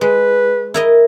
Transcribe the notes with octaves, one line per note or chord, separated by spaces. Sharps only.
G#3 B4
E4 A#4 D#5